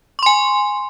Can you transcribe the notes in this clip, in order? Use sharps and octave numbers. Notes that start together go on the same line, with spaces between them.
G#5 C6 C#6